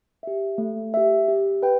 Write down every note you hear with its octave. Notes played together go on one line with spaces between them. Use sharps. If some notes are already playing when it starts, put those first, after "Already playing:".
G4 E5
A3
G4 E5
G4
B4 G5